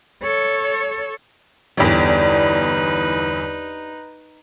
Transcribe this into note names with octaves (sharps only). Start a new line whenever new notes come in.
A4 C#5
G1 E2 D4 D#4 G4 B4 D5